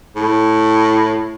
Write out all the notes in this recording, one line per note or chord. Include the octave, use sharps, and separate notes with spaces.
A2